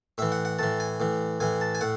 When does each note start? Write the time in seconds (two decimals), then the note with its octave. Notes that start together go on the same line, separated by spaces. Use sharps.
0.18 A2 E3 E5
0.32 F#5
0.45 F#5
0.59 A2 E3 A5
0.80 G#5
1.00 A2 E3
1.40 A2 E3 G#5
1.61 A5
1.75 G#5
1.81 A2 F#5